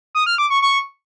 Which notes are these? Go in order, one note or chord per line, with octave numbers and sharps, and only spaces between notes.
D#6
F6
D6
C#6
C#6